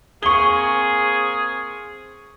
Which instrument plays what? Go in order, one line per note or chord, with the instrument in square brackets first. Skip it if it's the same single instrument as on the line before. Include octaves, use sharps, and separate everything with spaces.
[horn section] A#3 C4 G#4 [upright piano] C#6 G7